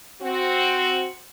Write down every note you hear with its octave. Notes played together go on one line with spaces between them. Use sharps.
C4 F#4